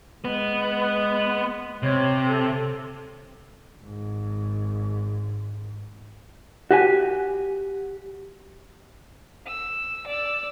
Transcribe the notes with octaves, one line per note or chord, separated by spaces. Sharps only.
G#3 B3 B4
C3 C#5
A4
G#1 G#2
F#4 G4 G#5
E6
D5 E6